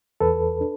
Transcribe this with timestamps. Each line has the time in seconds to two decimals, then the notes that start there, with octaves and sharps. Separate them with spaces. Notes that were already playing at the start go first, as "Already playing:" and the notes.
0.21 E2 A4 B4
0.61 D4